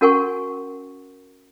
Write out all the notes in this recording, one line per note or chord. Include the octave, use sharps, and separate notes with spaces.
C#4 F#4 A#4 F#5 G#5 C#6